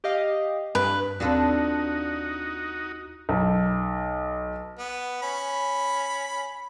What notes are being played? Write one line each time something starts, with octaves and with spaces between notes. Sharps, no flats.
G4 D#5 F5
G2 B4
D#2 C4 D4 D#4 F4 F#4 A4
B1
B3
C#4 B5